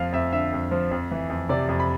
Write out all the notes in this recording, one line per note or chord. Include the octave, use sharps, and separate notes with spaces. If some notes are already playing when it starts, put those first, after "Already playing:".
Already playing: F2 F3 F5
F2 E5
D3 E5
F2
F3
F2
E3
F2
C3 D5
F2
B5